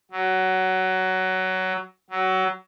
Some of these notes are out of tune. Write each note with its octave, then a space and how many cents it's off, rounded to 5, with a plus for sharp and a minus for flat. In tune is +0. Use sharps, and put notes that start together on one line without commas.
F#3 +15
F#3 +20